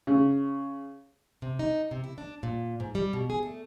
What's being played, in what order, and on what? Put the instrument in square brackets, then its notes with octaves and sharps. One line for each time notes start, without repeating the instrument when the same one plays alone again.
[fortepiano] C#3
[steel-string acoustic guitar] C3
D#4
C3
E4
D4
A#2
G#2
G3
B2
G#4
A3